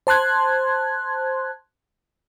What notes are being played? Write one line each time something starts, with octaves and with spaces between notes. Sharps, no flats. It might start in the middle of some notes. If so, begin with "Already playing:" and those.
C5 A5 C6 F#6 G#6